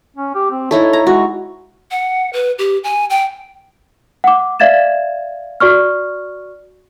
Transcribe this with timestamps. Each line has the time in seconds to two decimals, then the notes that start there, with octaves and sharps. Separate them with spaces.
0.17 C#4
0.35 G4
0.51 C4
0.71 D#4 E4 A4 C#5
0.93 A#5
1.07 G#3 F#4
1.91 F#5
2.33 B4
2.58 G4
2.84 G#5
3.10 G5
4.24 F#5 D6
4.60 D5 E5 F5 G#6 A6 E7
5.60 F#4 D5 C#6 F6